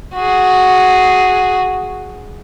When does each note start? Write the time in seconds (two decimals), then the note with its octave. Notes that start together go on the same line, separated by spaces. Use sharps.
0.15 F#4 G#4